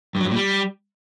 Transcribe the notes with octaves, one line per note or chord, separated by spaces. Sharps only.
G2
F#3
G2
A#2
G3